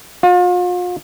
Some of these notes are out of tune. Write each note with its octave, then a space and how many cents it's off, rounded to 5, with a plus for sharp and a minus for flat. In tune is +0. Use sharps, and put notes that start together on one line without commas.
F4 +40